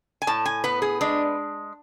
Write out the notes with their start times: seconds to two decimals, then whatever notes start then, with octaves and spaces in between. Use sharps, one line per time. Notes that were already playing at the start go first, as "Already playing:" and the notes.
0.22 G#5
0.27 A2 A5
0.46 G#5
0.64 B3 B4
0.82 G#4
1.01 G#3 D4